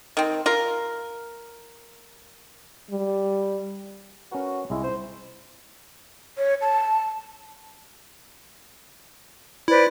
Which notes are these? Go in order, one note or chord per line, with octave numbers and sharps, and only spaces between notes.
D#3 C4
F4 A#4
G3
C#4 F#4 A#4 B4
C2 G#3 E4
C5
C#5
A5
E4 B4 C5 D5